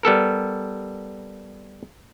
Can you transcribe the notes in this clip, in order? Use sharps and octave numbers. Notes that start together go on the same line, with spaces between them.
G3 B3 A4 A#4